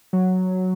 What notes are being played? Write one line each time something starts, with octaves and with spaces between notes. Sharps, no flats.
F#3